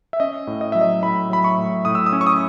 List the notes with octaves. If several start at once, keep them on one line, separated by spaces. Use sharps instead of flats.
E5
C#4 D#5
A2
D#5
F#3 E5
D#5
A2 B5
F#3 B5
C#6
A2
A2 D#6
E6
D#6
C#4
C#6
D#6